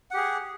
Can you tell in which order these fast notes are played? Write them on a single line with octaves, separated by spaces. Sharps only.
F#5 G4 G#4